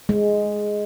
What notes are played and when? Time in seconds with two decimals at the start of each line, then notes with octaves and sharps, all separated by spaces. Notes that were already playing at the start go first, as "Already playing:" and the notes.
0.09 G#3